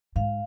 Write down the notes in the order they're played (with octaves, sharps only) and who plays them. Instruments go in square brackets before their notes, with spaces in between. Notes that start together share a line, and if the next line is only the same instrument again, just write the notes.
[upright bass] G#2 [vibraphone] F5